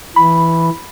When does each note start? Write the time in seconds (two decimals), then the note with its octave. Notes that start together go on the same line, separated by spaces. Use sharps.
0.16 E3 B5